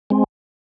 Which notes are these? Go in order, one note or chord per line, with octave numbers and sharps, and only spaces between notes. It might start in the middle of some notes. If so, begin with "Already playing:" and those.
G#3 C4